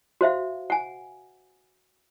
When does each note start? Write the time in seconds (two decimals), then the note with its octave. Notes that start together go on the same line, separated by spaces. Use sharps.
0.21 F#4 C5 E5 F5
0.70 F#5 G#5